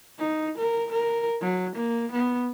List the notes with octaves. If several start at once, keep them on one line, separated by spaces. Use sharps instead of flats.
D#4
A#4
A#4
F#3
A#3
B3